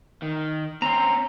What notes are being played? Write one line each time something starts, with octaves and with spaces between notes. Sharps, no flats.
D#3
C4 C#4 A#5 C6